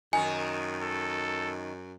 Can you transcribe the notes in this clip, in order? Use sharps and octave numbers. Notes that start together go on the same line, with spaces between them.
F#2 D#3 D#4 G#5
A4